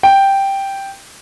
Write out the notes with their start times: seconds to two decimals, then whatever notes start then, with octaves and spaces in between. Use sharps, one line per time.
0.03 G5